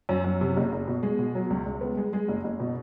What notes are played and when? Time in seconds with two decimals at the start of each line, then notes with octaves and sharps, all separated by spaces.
0.09 F#2
0.24 F#2
0.41 C3
0.57 F#1
0.72 F#1
0.88 B2
1.03 G#3
1.19 B2
1.35 F#3
1.50 C#2
1.66 C#2
1.81 B3
1.97 G#3
2.13 G#3
2.28 F#1
2.44 F#1
2.60 B2